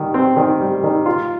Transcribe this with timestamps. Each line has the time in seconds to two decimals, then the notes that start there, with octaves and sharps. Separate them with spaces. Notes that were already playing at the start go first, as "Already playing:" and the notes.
Already playing: D#3 G3
0.14 C4
0.37 D#3
0.61 G3
0.84 D#3
1.06 F4